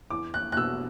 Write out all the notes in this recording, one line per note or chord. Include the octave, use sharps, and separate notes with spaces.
E2 D6
F#6
F#6
B2 E6